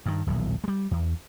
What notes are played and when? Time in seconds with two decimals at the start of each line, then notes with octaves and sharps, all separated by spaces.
0.06 G2 D#3
0.27 D#1 B1 E2
0.64 G3 G#3
0.91 E2